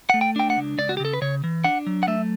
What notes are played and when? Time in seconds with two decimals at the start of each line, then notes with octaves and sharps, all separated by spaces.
0.10 A3 F#5
0.21 G5
0.36 D4 G5
0.50 F#5
0.57 C#2
0.78 C#2 D5
0.89 F#4
0.97 G4
1.00 C#3 A4
1.13 B4
1.22 C#3 C#5
1.44 E3
1.64 D4 F#5
1.86 F#3
2.03 F#5
2.07 A3 E5